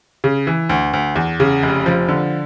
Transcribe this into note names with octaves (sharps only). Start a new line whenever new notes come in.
C#3
E3
D2
D2
E2
C#3
F1
F3
D3